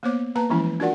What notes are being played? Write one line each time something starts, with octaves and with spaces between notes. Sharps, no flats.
A#3 B3 C5 C#5 D6
A#3 B4 A5 A#5
E3 F3 G#3 C#4 E4
D4 F4 F#4 A#4 D5 F#5